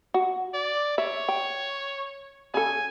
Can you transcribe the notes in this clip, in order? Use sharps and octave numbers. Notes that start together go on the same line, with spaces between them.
F#4
D5
C#5 E5
G5
C#3 A4 G#5